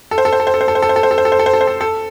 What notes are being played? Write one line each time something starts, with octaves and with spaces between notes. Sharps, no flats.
A4
C5
A4
C5
A4
C5
A4
C5
A4
C5
A4
C5
A4
C5
A4
C5
A4
C5
A4
C5
A4
C5
A4
A4